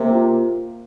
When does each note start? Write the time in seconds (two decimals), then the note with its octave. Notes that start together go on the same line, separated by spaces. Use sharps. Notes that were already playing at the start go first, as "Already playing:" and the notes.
Already playing: C3 A#3
0.10 F4